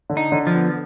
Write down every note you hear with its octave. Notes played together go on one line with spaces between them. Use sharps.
D3
D#4
D3
F3
B3